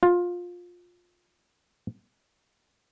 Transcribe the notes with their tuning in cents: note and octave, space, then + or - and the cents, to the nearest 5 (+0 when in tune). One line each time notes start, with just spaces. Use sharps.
F4 +15